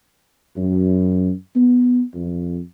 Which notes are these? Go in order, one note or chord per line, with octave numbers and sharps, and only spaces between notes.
F#2
B3
F2